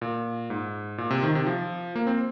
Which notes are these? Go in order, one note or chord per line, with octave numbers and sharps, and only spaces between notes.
A#2
G#2
A#2
C3
D#3
C3
F3
A#3
C4